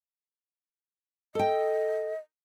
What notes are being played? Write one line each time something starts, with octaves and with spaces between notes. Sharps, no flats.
A4 D#5 G5